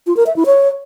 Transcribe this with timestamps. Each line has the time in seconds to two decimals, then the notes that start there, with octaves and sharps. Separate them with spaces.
0.07 F4
0.17 A#4
0.26 E5
0.36 E4
0.46 C#5